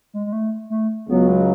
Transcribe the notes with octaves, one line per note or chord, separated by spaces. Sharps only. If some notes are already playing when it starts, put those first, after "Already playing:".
G#3
G#3
A3
A3
C#2 C#3 F#3 B3
G#3